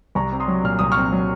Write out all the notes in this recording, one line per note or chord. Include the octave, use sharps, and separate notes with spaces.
C2 A#5 C#6
C4
C6 D#6
F#3
A#2 F6
C2 D#6
C#6 F6
C4
F#3